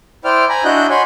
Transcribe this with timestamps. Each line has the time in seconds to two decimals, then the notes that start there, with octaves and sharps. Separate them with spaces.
0.25 E4 C5 D5 G5 F6
0.49 G#5 A#5 B5
0.64 D4 E4 F#4 D#5 F#6 G6
0.90 C#5 F#5 G#5 B5 C6